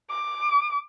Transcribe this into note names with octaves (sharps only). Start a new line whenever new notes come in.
D6